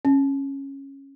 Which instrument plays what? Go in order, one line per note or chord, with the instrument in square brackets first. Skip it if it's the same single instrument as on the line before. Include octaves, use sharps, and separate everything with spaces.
[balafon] C#4